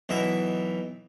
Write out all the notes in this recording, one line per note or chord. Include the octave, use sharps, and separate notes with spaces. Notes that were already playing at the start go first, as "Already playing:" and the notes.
B1 E3 D#5 E5